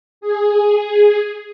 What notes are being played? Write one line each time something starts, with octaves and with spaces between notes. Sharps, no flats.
G#4